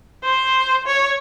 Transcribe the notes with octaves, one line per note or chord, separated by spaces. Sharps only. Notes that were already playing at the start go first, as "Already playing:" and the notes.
C5
C#5